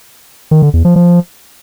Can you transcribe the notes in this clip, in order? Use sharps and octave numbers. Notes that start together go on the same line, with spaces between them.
D#3
D3
E2
F3
F3